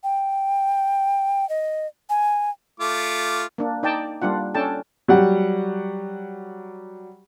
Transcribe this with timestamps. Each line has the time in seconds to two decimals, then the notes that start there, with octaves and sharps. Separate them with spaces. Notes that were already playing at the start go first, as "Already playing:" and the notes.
0.03 G5
1.49 D#5
2.09 G#5
2.80 A3 F4 D6
3.58 A#3 D4
3.83 D#4 D5 G5 A5
4.22 G3 A#3 D4 F4 F#5
4.55 C#4 D4 A4 G5 A5
5.08 F#3 G3 G4 F#5